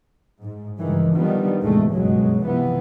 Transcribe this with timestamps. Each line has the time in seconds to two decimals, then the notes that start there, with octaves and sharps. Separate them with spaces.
0.42 G#2
0.80 C#2 G2 D#3 E3
1.12 D3 D#3 F3 G3 B3
1.62 A1 E2 A2 C3 G#3 A3
1.92 G1 C#2 F#2 B2 F#3 G#3
2.45 C3 E3 F3 B3